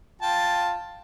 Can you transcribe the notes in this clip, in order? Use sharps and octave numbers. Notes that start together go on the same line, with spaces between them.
F4 G5 A5